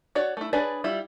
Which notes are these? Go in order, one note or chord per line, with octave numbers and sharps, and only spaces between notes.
F#4 C#5 D5
A3 E4
D4 G#4 B4 C#5 D5
G3 E4 F4